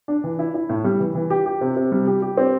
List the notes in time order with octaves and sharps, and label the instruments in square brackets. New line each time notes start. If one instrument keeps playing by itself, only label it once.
[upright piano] D4
E3
E4
E4
A2
G3
E3
E3
G4
G4
C3
C3
G3
G4
G4
C4